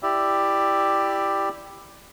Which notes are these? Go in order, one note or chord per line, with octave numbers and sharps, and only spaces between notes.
E4 G4 D5 E5